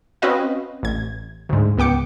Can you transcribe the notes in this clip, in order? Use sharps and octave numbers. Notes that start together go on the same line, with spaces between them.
C4 C#4 F#4 B4 D#5 F5
A1 G#6
D2 G#2
C#2 B3 G5 D6 C#7